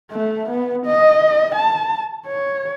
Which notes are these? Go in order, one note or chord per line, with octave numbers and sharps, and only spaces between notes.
A3
B3
D#5
A5
C#5